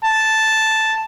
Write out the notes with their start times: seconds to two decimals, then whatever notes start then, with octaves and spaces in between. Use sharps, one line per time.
0.04 A5